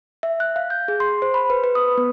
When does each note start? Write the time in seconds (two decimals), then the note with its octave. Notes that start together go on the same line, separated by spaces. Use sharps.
0.23 E5
0.40 F#6
0.56 F5
0.70 G6
0.88 G#4
1.00 C6
1.22 C5
1.34 B5
1.50 B4
1.64 B4
1.75 D#6
1.97 B3